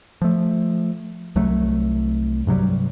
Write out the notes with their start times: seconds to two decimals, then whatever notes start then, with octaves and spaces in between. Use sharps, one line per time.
0.22 F3 A3
1.36 C2 F#3 A3
2.47 G2 C3 F#3 G3